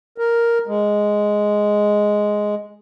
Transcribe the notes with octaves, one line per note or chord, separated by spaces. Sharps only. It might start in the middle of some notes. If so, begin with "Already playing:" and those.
A#4
G#3